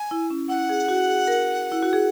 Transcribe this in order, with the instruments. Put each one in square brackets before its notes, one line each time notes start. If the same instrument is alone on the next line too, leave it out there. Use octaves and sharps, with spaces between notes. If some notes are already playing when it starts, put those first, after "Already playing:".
Already playing: [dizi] G#5
[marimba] E4
C#4
[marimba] E4 [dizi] F#5
[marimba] G#4
F#4
G#4
A#4
E4
F#4
G#4